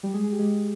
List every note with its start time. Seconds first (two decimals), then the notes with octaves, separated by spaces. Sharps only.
0.03 G3 G4
0.14 G#3 G#4
0.24 G#4
0.32 G4
0.39 G#3 G#4